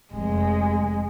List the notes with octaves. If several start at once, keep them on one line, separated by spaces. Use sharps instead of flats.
F1 G#3